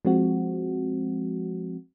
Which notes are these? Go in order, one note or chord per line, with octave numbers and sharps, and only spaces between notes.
F3 G#3 C4 F#4